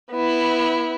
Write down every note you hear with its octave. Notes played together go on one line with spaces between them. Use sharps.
B3 E4